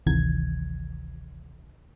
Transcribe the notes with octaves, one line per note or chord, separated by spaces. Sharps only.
G#1 D2 C3 D#3 E3 G#6